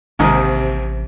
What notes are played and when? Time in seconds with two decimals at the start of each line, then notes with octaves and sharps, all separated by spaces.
0.19 A1 D#2 G#2 C3 D#3